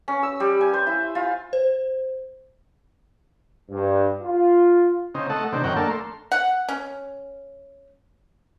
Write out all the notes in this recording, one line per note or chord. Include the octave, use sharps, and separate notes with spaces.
C#4
E6
G3
G#5
C5
E4
F4
C5
G2
F4
C#3 C4 D#4
A3 A4 D#5 F#5
C3 D#3 C4 D4
F#2 D#3 A#4 C#5 F#5 G5
A3 A#3 D4 A4 A#4
C6
F#5
C#4